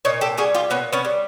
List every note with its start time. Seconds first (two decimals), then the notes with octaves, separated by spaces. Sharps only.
0.05 A#2 C#5 D#5
0.21 G4 A4
0.38 G3 F#4 G#4
0.55 F4 G4
0.70 A#2 B3 C#4
0.93 B3 C#4
1.05 G3